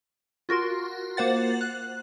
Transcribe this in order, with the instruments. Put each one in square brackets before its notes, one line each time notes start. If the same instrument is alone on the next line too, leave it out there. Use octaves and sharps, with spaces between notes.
[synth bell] F4 F#4 A#4 C6
A#3 C5 F#5 A6
F#6